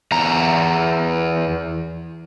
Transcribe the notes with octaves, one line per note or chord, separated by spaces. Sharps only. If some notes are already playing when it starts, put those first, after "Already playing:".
E2 A#5